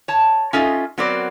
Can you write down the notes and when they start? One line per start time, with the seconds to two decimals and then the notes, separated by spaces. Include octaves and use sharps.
0.08 C#5 A5
0.53 C#4 D#4 F4 A4 D#5 E5
0.98 F#3 B3 C4 F#4 A#4 D5